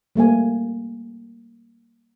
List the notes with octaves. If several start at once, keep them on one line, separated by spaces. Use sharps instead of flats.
G3 A3 A#3 G#5